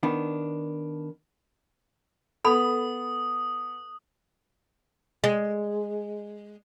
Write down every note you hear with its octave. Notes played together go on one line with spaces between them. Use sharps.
D#3 B3 D4
B3 A4 B5 D#6
G#3